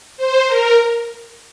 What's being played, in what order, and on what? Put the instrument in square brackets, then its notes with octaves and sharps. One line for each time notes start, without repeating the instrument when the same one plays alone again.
[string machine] C5
A#4